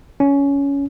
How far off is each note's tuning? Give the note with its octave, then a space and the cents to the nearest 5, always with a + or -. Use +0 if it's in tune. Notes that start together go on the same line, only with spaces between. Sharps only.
C#4 +15